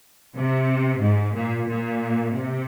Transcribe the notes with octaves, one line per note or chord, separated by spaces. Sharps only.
C3
G#2
A#2
A#2
C3